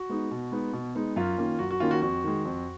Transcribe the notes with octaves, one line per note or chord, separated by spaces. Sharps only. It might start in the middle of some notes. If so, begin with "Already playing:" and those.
Already playing: F#4
G#3 B3 D#4
B2
G#3 B3 D#4
B2
G#3 B3 D#4
F#2 F4
D#3 A#3 C#4
F#2 F#4
F#4
D#3 A#3 C#4 F4
F#4
F2 F#4
D#3 G#3
F2